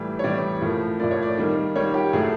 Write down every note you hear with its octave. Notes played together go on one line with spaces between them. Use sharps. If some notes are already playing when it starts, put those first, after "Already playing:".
Already playing: A2 E3 G3
C#5
A2 E3 G3 D5
A2 F3 A#3
A2 F3 A#3 D5
C#5
D5
D#3 G3 A#3
D#3 G3 A#3 C#5
G4
A2 F#3 A3 G#4